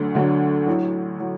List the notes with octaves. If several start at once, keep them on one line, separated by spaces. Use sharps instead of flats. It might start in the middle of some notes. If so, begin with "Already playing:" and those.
Already playing: D2 D3 F#3 A3 D4
D2 D3 F#3 A3 D4
A1 A2 F#3
A2 F#3